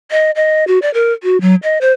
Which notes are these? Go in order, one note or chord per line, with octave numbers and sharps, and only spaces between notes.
D#5
D#5
F#4
D5
A#4
F#4
F#3
D#5
C5